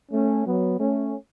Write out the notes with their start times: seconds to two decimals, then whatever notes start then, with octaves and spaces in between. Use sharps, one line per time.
0.12 A3 C#4
0.46 F#3 B3
0.80 A3 C#4